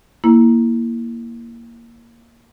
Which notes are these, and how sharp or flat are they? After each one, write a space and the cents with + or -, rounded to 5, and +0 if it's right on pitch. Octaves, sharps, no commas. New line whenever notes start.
A#3 +0 E4 +0